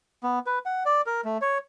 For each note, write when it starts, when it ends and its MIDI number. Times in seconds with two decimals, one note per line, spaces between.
0.23 0.39 59
0.47 0.59 71
0.66 0.83 78
0.85 1.01 74
1.06 1.21 70
1.25 1.38 57
1.41 1.58 73